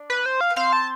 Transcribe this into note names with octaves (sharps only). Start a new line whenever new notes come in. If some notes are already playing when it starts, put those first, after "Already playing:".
Already playing: D4 D5
B4
C5
F5
B4
C4 C5 F5
A5